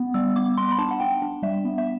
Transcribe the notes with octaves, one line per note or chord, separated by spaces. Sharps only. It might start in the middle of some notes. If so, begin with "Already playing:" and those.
Already playing: B3
G3 E6
B3 D6
B3 C6
B5
D4 A5
F#5
D4 G5
D4
G3 E5
B3
E5